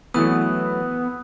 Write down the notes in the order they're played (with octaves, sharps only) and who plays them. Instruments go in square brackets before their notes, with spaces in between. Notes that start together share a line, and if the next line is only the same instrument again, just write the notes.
[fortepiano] E3 [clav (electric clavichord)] F#3 A3 B4 [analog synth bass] B3 [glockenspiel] D#6 F#6